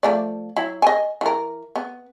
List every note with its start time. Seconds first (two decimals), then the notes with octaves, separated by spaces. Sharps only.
0.03 F3 A3 D5
0.56 F#3 E4
0.82 D#5 G#5
1.21 E3 A#4
1.76 B3